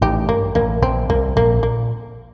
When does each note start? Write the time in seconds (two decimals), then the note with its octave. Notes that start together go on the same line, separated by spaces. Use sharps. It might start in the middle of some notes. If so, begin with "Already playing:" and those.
0.01 A1 A2 D#4 G4
0.29 G2 A#3
0.55 A1 A2 A#3
0.82 A#1 A#2 C4
1.09 C2 C3 A#3
1.36 A#1 A#2 A#3
1.63 A#2 A#3